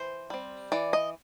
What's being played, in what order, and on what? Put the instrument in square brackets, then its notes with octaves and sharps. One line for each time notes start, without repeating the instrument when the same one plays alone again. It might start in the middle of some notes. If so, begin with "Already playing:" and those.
Already playing: [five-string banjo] E3 C5
G3 C4
E3 D5
D#5